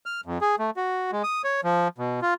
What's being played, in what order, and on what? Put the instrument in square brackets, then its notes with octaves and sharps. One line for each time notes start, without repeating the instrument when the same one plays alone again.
[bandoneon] F6
F2
G#4
A3
F#4
G#3
D#6
C#5
F3
B2
F4